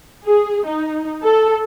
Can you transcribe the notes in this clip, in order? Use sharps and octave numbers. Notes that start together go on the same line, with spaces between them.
G#4
D#4
A4